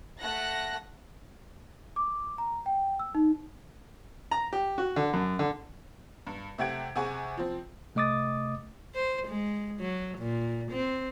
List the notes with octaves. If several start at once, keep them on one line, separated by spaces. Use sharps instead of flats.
A3 F#5 F#6 A#6
D6
A#5
G5
E6
D#4
A#5
G4
F#4
D3
F#2
D3
G2
C3 A3 G4 F#5 G#6 D7
C3 G#4 F#5 G#5 C#6
F3 C4
C3 A3 D#5 D6 D#6 A6
C5
G#3
F#3
A#2
C4